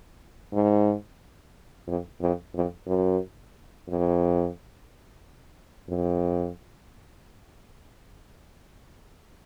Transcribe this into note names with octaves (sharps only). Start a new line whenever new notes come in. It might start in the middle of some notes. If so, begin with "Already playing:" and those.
G#2
F2
F2
F2
F#2
F2
F2